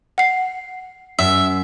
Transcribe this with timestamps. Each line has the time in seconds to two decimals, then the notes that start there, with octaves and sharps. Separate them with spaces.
0.18 F#5 C7
1.19 F#2 E5